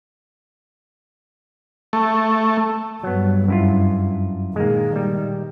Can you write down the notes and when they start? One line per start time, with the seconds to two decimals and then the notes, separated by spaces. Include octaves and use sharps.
1.93 A3
3.03 G2 F#3 B3
3.48 F#2 E4 F4
4.56 A#2 D#3 G#3 A#3
4.96 G3